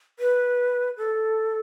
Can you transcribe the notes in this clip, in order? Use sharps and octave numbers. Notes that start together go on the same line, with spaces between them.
B4
A4